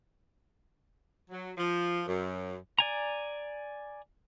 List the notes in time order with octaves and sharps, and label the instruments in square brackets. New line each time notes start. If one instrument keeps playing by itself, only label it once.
[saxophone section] F#3
F3
F#2
[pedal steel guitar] D5 G#5 A#5